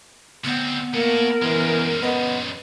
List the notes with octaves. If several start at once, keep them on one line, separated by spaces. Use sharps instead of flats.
D2 B3 C4
A2 A#3 E4 A#4
F#2 E3 G#3
B3 D#5